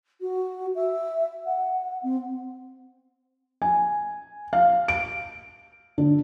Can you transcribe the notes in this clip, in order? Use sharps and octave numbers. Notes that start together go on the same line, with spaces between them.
F#4
E5
F#5
C4
G#5
F5
D7
D3